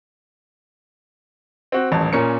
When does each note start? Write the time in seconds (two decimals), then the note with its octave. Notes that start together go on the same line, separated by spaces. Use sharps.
1.72 C4 F#4
1.91 D#1 A1 A5
2.13 A#2 C#4 A#4 C#7